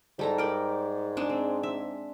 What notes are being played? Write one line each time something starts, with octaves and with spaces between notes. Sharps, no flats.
G#2 G3 A4 A#5
A#4 D5 G5
G#3 D4
C4
E5